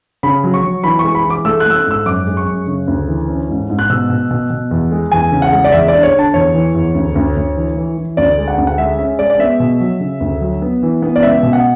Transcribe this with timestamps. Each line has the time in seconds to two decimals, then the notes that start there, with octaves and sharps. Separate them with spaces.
0.23 C#3 B5
0.44 F#3
0.54 C#6
0.63 F#3
0.84 E3 B5
0.99 C#6
1.04 G#3
1.15 B5
1.25 E3
1.30 D6
1.45 A3 E6
1.60 F#6
1.65 A3 E6
1.76 F#6
1.86 G#2 E6
2.06 F#2 D6
2.26 G#3
2.37 C#6
2.47 F#2
2.67 C#3
2.88 D2
3.08 E3
3.28 C#4
3.49 G#2
3.70 G#2
3.79 F#6
3.90 B2 E6
4.10 B2
4.31 B2
4.50 B2
4.71 E2
4.91 G#3
5.11 E2 G#5
5.32 C#3
5.42 F#5
5.52 G#3
5.64 D5
5.72 E2 E5
5.88 D3 D5
6.03 C#5
6.14 D3
6.19 A5
6.34 E2 C#5
6.54 E3
6.75 E2
6.95 D2
7.15 D2
7.36 D2
7.56 E3
7.77 E3
7.97 E3
8.17 D2 D5
8.38 G#3
8.48 F#5
8.58 D2
8.67 F#5
8.78 G#3 E5
8.98 C#4 E5
9.19 G#3 D5
9.30 D5
9.39 B3 E5
9.60 B2
9.80 F#3
10.00 C#3
10.20 D2
10.41 F#3
10.62 B3
10.83 E3
11.02 B3
11.16 D5
11.22 C#2 E5
11.43 B2
11.53 F#5